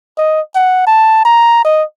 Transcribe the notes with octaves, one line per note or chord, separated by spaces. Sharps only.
D#5
F#5
A5
A#5
D#5